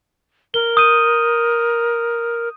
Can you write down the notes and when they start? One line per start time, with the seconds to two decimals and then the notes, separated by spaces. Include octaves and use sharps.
0.54 A#4 G7
0.77 D#6 G6 D#7